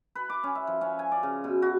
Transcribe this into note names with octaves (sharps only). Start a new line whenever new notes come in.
B4
D6
C#4
E5
F3
C#4
G#5
D5
C#3
B2
F#4